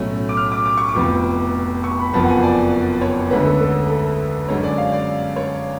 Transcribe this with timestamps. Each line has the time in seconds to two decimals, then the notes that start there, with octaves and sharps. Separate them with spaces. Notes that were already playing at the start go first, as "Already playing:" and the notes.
Already playing: B1 A2 F#3 A3 C#4
0.29 D6
0.37 F6
0.52 D6
0.66 D6
0.77 C#6
0.89 D6
0.95 F1 F2 F3 B3
1.84 C#6
1.99 B5
2.13 F#1 F2 F3 B3 A5
2.24 F#5
2.29 G#5
2.43 D5
3.01 C#5
3.30 D2 D3 G#3 C#4 B4
3.45 A4
3.61 A4
3.90 A4
4.48 F#2 D3 G#3 C#4 C#5
4.63 D5
4.78 F5
4.93 D5
5.36 C#5